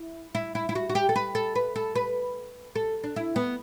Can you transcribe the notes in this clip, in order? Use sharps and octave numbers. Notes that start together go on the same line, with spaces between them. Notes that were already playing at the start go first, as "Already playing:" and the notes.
Already playing: E4
E4
E4
E4
F#4
F#4
G4
A4
B4
A4
B4
A4
B4
A4
D4
E4
B3